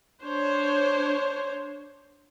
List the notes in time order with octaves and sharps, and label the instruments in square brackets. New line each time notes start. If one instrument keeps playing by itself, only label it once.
[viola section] D4 C5 C#5